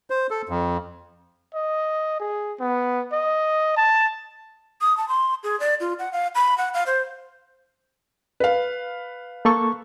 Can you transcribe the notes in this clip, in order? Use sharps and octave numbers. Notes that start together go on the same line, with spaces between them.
C5
A4
F2
D#5
G#4
B3
D#5
A5
D#6
A5
C6
G#4
D5
F4
F#5
F5
B5
F#5
F5
C5
B4 F5
A#3 A4 C#6